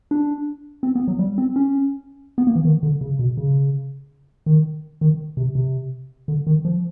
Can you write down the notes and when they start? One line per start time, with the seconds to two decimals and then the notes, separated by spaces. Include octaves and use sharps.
0.11 D4
0.83 C4
0.95 B3
1.08 F#3
1.19 G3
1.38 C4
1.56 C#4
2.38 B3
2.47 A#3
2.56 E3
2.65 D#3
2.83 D3
3.01 C#3
3.19 B2
3.37 C#3
4.46 D#3
5.01 D#3
5.37 C3
5.55 C3
6.28 D3
6.47 D#3
6.65 F3